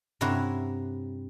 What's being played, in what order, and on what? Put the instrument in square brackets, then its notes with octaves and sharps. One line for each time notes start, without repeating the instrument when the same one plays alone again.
[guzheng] G2 C3 E4 C#5 F#5 A#5